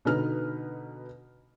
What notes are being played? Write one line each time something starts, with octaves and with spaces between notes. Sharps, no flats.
B2 D3 D#4 B4 A#5 F6